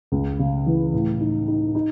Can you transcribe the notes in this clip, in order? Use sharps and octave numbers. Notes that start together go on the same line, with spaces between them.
C#2
C#3
E3
A2
D#4
D#4
D#4